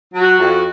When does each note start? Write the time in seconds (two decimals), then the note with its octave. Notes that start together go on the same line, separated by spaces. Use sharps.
0.13 F#3
0.21 F#4
0.38 F2